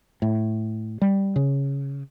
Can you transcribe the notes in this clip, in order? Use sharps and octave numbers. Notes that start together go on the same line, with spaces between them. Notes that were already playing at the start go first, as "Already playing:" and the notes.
A2
G3
C#3